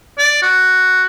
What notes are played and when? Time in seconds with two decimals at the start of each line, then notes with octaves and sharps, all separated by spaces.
0.19 D5
0.42 F#4